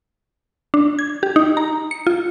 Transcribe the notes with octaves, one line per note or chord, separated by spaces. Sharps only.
D4
G#6
G4
D#4
A#5
C#7
F4